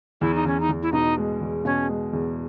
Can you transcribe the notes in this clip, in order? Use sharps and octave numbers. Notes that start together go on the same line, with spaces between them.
E2 E4
D#4
E2 C#4
D#4
E2
E4
B2 D#4
G#3
E2
B2 C#4
G#3
E2